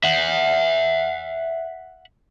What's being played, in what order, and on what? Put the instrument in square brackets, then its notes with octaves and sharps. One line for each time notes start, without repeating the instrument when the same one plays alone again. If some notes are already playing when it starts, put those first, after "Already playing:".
[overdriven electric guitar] E5 F#5